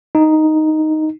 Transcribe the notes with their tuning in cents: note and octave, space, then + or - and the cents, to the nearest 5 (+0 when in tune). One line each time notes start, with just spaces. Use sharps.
D#4 +0